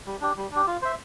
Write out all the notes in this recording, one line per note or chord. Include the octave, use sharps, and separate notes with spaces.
G3
D4 G4
G3
D4 G4
F4
C5 E5